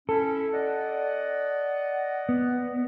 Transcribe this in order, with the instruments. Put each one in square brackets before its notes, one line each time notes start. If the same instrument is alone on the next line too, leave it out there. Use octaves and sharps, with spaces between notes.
[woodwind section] C#4 E4 [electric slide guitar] A4
[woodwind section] D5 D#5 F#5
[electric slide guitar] B3